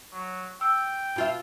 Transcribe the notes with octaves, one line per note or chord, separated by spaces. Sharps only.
F#3
G5 E6
B2 F4 E5